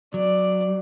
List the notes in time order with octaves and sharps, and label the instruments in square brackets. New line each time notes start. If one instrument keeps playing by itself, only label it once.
[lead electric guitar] F#3 [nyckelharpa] D5